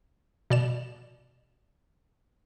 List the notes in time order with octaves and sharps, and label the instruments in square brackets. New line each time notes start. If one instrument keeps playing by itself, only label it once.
[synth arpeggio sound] B2 D5 E7